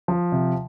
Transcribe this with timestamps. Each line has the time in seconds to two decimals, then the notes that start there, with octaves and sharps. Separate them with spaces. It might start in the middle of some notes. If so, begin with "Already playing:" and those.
0.08 F3
0.32 C3